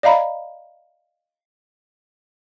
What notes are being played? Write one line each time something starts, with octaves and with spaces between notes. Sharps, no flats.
D5 D#5 F5 A#5 B5